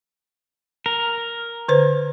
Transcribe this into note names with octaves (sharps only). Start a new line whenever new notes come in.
A#4
D3 B4 C5